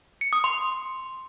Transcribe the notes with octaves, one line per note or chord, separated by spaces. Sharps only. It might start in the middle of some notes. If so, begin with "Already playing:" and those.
C#7
D#6
C6